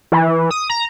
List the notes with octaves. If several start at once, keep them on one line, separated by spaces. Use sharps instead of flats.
E3
D#6
A#5